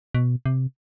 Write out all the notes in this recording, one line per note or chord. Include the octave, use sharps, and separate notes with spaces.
B2
C3